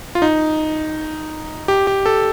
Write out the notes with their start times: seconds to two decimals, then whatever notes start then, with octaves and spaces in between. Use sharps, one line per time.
0.15 F4
0.22 D#4
1.68 G4
1.87 G4
2.06 A4